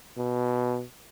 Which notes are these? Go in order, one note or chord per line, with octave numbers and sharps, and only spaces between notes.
B2